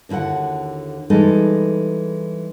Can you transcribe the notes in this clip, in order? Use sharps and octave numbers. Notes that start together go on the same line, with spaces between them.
D#2 D3 E4 F#4 F#5
E3 G3 G#3 D#4 G#4 A4